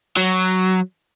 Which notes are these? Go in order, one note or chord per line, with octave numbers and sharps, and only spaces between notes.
F#3